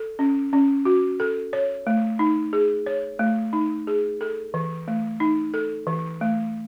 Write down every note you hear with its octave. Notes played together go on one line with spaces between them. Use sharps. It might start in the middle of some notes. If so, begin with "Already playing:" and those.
Already playing: A4
C#4
C#4
F#4
A4
C#5
A3
D#4
G#4
C#5
A3
D#4
G#4
A4
E3
A3
D#4
A4
E3
A3